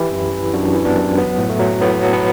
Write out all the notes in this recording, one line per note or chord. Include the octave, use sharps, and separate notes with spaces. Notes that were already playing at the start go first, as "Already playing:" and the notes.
Already playing: E3 E4 G4
F#2
E3
F#2 D4 F#4
E3
B3 D4
F#2
F#3 B3
A2
A3
F#3
A2 B3
F#3
B3